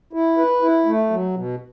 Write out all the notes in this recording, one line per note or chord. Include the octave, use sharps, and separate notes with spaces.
E4
B4
E4
A3
F#3
B2